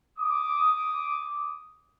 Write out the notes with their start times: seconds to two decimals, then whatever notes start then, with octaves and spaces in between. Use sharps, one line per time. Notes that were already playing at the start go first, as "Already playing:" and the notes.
0.18 D6 D#6